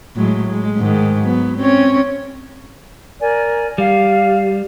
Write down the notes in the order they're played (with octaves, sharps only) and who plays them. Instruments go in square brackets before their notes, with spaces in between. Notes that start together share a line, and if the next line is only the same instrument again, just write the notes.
[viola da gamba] A2 F#3 G#3
G#3
G#2 D#3
F#3 B3
C4 C#4 C#5
[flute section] A#4 D5 G#5
[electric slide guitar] G3 [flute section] F5